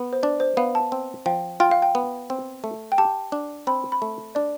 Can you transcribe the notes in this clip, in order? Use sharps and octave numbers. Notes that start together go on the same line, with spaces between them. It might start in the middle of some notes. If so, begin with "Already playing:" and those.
Already playing: B3
C5
D4 D5
C5
B3 F5
A5
C4
F3 G5
F4 G5
F5
G5
B3
C4
A3
G5
G4 A5
D4
C4 B5
B5
A3
D4 D5